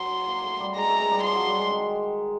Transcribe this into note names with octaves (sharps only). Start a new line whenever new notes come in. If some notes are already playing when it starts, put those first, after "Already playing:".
Already playing: F#3 C6
A#3
A3
G3
G#3 A#5
A3
G#3
G3
F3 C6
F#3
G3
G#3
D#3